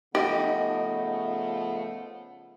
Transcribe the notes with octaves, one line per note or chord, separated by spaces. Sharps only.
C#3 F3 A3 B3 D#4 G4